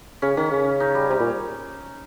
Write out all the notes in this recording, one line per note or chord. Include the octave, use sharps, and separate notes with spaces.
C#3 C#4
D#3 C#4
C#3
D#4
G3
C3 G3
A#2